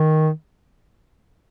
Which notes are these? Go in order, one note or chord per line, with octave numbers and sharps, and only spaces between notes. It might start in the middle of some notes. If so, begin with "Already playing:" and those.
Already playing: D#3